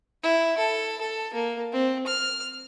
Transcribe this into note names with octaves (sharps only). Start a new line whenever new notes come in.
E4
A4
A4
A#3
C4
F6